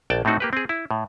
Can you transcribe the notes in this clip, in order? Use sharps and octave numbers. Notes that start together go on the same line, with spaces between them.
A#1 D5 G5 A5
A2 A3 C4 D#4 F#4
A#3 G4 B4
C4 G#4
E4
A2